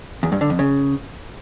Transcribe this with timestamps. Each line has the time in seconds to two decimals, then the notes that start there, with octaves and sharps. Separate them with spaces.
0.23 E2
0.32 G2
0.41 D3
0.50 F2
0.59 C#3